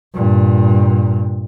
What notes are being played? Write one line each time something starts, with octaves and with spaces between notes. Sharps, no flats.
G2 A#2